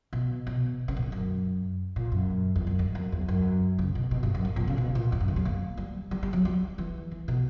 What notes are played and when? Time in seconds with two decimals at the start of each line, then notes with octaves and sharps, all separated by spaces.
0.13 B2
0.47 B2
0.88 C#3
0.96 A#2
1.12 F#2
1.96 A#2
2.12 F#2
2.56 E2
2.67 F#2
2.79 G2
2.95 F#2
3.12 E2
3.28 F#2
3.79 C#3
3.95 B2
4.11 B2
4.23 G2
4.34 F#2
4.45 G2
4.56 A#2
4.68 C#3
4.78 B2
4.95 A#2
5.12 E2
5.20 F#2
5.28 D3
5.36 G3
5.45 A#3
5.77 G3
6.11 G3
6.23 G3
6.33 F#3
6.45 G3
6.78 E3
7.11 E3
7.28 B2